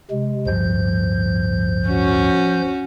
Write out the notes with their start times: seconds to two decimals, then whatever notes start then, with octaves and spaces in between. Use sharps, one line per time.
0.11 C3 G#3
0.47 D1 G2 F3 G6
1.89 C#4 F#4